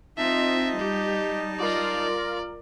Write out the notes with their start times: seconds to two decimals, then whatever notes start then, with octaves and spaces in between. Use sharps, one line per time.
0.18 C4 D#4 F4 D#5 E5 A5
0.79 G3 G4
1.60 F4 A#4 D5